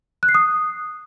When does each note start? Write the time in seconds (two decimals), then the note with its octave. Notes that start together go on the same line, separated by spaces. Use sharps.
0.23 F#6
0.29 C7
0.35 D#6